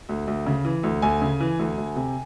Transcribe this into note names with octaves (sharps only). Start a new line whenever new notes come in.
D2
D2
C#3
E3
D2
D2 G#5
C#3
E3
D2
D2
C3